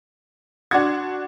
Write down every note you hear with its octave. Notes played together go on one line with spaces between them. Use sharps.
D4 F#4 F#5 C6 D6 G#6